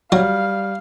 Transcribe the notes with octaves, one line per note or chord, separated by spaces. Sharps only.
F#3 G3 F5